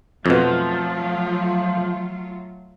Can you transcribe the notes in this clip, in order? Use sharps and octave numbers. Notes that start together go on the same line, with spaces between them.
F2 B2 F3 F#3 A3 F4